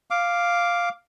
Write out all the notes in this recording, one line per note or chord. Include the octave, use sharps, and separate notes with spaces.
F5 D6